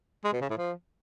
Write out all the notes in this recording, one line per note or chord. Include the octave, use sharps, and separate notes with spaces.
G#3
B2
C#3
A2
F3